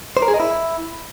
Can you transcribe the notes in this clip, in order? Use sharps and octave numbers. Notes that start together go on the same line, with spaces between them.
C5
A#4
G#4
D#5
E4